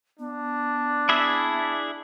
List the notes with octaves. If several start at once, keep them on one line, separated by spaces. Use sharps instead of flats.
B3 D4
E4 G#4 E5